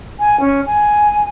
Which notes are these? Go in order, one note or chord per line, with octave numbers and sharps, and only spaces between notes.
G#5
C#4
G#5